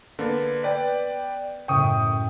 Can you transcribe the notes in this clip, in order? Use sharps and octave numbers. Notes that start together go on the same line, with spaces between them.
D3 A#3 B3 A6
B4 D5 G5
F#2 A2 C#3 G5 C#6 D#6